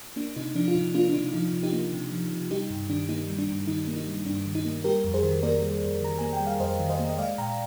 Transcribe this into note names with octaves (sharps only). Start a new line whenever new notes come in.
A#3 D4
C3 D#4
F3 D4
F4
C3 D#4
A#3 D4 F4
D4
C3 D#4
F3 D#4
C3
D#4 G4
A#3
C3
F3
C3
G3 D#4 G4
G2
D#3 D4
A#3 D#4
G3
D4
G2
D#3 D#4
A#3
D#4
G3
G2 D4
D#3
D#4
A#3
G3 G4 A#4
F2
G#4 C5
D#3
A#3 A#4 D5
G3
F2
D#3 A#5
A#3 G#5
G5
G3
F5
F2 C5 D#5
D#3
C5 D#5
A#3
D#5
G#3 D5 F5
A#2 G5 A#5